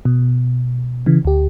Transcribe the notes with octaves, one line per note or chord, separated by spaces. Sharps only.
B2
C#3 E3
D2 G4